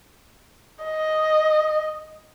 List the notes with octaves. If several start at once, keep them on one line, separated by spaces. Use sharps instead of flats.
D#5